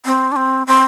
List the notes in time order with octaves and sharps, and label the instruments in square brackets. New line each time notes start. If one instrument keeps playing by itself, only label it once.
[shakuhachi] C4
D4
C4
C4